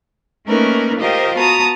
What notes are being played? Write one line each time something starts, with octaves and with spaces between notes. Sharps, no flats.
A3 A#3 C#4 D#4 A#4 B4
F4 G4 A#4 C5 D#5
B3 F#4 A5 A#5 D#6